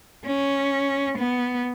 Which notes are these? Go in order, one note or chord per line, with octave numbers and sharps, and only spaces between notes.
C#4
B3